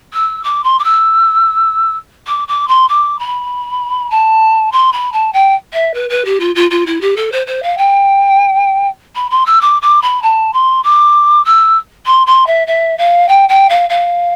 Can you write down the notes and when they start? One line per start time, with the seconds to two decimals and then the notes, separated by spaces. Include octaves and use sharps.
0.13 E6
0.43 D6
0.64 C6
0.79 D6
0.84 E6
2.27 D6
2.48 D6
2.68 C6
2.88 D6
3.19 B5
4.10 A5
4.72 C6
4.92 B5
5.12 A5
5.33 G5
5.73 E5
5.94 B4
6.09 B4
6.25 G4
6.40 F4
6.55 F4
6.70 F4
6.86 E4
7.01 G4
7.16 A4
7.32 C5
7.47 C5
7.63 F5
7.78 G5
9.15 B5
9.30 C6
9.46 E6
9.61 D6
9.82 D6
10.02 B5
10.22 A5
10.53 C6
10.83 D6
11.45 E6
12.06 C6
12.27 C6
12.47 E5
12.67 E5
12.98 F5
13.28 G5
13.49 G5
13.69 F5
13.89 F5